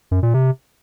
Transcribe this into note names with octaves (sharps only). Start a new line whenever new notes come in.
F#2
A#2
C3